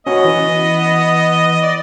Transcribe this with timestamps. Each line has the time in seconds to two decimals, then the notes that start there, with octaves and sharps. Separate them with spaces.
0.07 B3 C#4 F#4 D#5
0.25 E3
1.62 D5